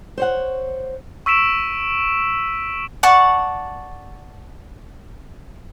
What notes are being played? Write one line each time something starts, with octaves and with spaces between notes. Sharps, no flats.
C5 C#5 F#5
C#6 E6 B6 D7 E7
D5 F#5 A5 C#6